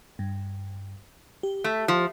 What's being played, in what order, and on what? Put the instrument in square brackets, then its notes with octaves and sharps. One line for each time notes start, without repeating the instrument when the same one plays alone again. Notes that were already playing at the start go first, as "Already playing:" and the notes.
[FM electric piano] G2
G4
[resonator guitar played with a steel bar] A3
F3